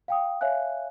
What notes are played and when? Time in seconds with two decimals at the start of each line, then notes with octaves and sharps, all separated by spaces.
0.08 F5 G5 D#6
0.41 C#5 E5 F5 G#5 F#6